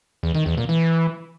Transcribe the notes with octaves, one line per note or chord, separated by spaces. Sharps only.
E2
D#3
E2
A#2
E3